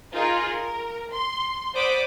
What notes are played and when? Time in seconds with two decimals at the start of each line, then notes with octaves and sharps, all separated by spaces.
0.13 D#4 F4 G#4 A#4
0.49 A#4
1.11 C6
1.74 C5 D5 F#5 B5 D6 D#6